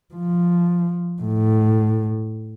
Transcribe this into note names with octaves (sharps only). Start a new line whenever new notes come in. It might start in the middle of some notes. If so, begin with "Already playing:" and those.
F3
A2